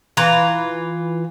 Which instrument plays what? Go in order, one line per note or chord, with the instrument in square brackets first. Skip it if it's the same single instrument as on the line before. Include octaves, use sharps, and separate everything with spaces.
[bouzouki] E3 F4 A#5